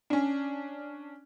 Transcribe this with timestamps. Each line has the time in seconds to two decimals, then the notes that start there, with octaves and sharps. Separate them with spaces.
0.10 C#4 D4